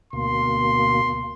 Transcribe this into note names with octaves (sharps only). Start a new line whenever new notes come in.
D2 B2 A#3 C6